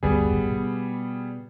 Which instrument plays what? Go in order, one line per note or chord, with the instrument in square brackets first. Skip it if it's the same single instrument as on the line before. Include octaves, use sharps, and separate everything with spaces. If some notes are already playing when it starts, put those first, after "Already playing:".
[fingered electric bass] G1 D2 [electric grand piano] G3 B3 G#4
[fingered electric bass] G#1
B2